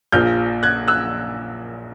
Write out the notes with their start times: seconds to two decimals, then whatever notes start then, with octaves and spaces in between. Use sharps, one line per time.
0.12 A#1 A#2 F3 F6 G6
0.63 F#6 G#6
0.88 E6 F#6